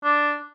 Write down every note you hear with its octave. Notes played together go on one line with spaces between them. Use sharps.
D4